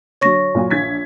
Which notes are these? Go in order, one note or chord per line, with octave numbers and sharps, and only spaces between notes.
D3 F#3 C#5 C#6 A#6
A#2 F#3 G#5
A#1 G#6 B6